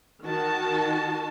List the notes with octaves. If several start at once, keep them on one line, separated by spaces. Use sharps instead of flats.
D#3 F#4 A5